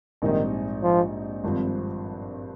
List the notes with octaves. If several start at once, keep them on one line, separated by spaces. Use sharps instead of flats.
A#1 G#2 D#3 G3 C4 D#4
F3
G#1 G2 F3 C4